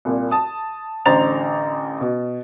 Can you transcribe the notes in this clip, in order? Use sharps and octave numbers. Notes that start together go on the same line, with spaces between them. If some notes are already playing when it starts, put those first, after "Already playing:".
C2 A#2
A5 D#6
A1 D3 C5 A#5 A6 F7
B2